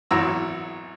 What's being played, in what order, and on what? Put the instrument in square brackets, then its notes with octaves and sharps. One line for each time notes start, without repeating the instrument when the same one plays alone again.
[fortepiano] G#1 E2 F#3 A#5 E6